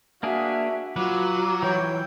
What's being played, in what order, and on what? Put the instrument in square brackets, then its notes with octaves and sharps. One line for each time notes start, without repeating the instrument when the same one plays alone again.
[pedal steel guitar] A#3 D4 G#4 [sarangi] F#4 [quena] E5
[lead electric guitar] F#3 [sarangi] F4 [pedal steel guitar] B4 [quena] D6
[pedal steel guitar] E3 [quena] C#5 [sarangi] G5